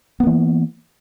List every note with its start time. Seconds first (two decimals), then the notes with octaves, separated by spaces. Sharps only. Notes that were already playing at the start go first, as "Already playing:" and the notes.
0.20 B3
0.23 A#3
0.27 E3